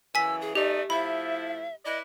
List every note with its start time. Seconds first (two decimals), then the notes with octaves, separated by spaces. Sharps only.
0.15 F#2 C#3 E3 G#5 E6 B6
0.41 G#4
0.55 B2 A3 D#4 G4 D5
0.90 A2 F3 E4 E5 B5
1.85 E4 B4 D5 D#5